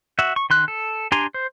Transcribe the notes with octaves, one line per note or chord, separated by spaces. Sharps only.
F#4 E5
C#6
D#3 C6 F#6
A4
D4 G4 G#5 A#5 C6
C5